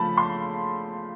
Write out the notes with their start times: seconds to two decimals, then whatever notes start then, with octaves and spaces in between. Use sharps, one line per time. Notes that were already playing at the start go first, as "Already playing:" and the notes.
Already playing: C#3 F3 A3 A5 B5
0.17 C6